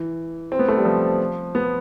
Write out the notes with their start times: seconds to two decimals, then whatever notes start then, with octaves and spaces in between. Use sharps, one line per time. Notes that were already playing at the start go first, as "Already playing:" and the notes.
Already playing: E3
0.52 C4
0.59 B3
0.68 A3
0.77 G3
0.85 F3
1.55 B3